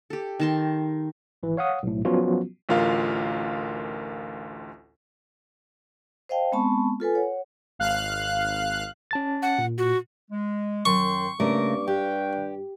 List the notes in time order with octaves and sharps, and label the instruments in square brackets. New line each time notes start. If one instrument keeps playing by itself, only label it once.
[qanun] G4 A4
D#3 A5 C6
[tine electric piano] G#1 E3
C#5 F5 F#5 D#6
B1 A2
F3 F#3 B3 C#4 F4 F#4
[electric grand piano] A1 D2 F4 A#4 F5
[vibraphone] C5 D#5 F5 G5 A5
G#3 B3 C4 A5 B5 C#6
F4 A4 B4 G#5
C#5 F#5
[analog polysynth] G#1 F5 F#6
[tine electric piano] C#4 A5 A6
[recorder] F#5
[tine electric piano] A#2
[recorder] F#4
[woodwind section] G#3
[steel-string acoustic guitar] F#2 [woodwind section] D#3 G5 C6 [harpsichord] C#6
[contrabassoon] G2 [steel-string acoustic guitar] C#3 A3 A#4 [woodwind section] A#3 D6
[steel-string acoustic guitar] G4 [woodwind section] B4 F5 G5